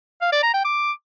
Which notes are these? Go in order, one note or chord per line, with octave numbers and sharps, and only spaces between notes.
F5
D5
A#5
G5
D6